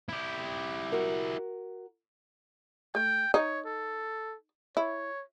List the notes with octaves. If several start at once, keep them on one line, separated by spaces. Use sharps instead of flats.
E4 G4
F#4 A#4
A3 G5
D#4 C#5
A4
E4 C#5